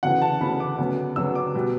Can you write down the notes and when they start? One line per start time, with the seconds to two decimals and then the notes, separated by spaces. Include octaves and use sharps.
0.03 D2 C#3 E3 F#5
0.22 A5
0.41 D2 C#3 E3 B5
0.60 D6
0.78 D2 C#3 F#3 B3
1.16 D2 C#3 F#3 B3 E6
1.35 D6
1.55 B2 G3 B3